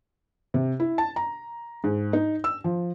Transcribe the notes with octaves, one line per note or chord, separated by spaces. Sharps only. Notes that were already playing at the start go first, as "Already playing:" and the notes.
C3
E4
A5
A#5
G#2
D#4
E6
F3